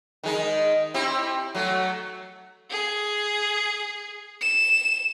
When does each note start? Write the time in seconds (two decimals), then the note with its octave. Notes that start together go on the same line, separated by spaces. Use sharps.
0.24 D#3 G#3 D#4
0.94 C4 E4 G4
1.55 F#3 A3
2.70 G#4
4.42 E7